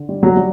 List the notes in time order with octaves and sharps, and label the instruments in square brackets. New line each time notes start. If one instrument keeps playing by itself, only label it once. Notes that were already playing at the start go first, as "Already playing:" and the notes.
Already playing: [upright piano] D3
G3
[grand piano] F#3
[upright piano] G3